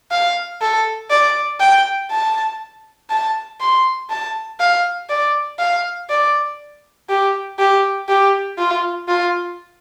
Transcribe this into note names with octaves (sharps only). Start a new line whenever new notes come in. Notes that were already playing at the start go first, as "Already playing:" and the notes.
F5
A4
D5
G5
A5
A5
C6
A5
F5
D5
F5
D5
G4
G4
G4
F4
F4